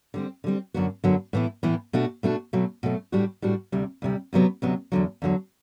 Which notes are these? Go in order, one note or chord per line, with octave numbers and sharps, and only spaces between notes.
D3 G3 C4
D3 G3 C4
F#2 D3 F#3 B3 F#4
F#2 D3 F#3 B3 F#4
A2 E3 B3 E4
A2 E3 B3 E4
B2 A3 D4 F#4
B2 A3 D4 F#4
B2 F#3 A3
B2 F#3 A3
A2 G3 D4 F#4
A2 G3 D4 F#4
D2 C3 G3
D2 C3 G3
D2 C3 F#3 B3
D2 C3 F#3 B3
E2 D3 F#3
E2 D3 F#3